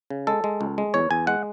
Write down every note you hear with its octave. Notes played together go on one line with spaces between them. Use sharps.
C#3
G#3 A4
G#3
C#2
G#3
E2 C#5
E2 G#5
G#3 F#5